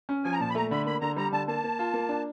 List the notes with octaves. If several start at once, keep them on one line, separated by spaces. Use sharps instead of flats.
C#4
F3 G#5
A#5
A#2 A5
B5
A3 A#5
D3 B5
A#3 B5
D3 A#5
G3 A#5
D3 A5
A#3 A5
A#3
F4
A#3
D4